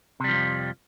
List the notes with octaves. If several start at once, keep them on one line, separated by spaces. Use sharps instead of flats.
F2 C3 F3 G3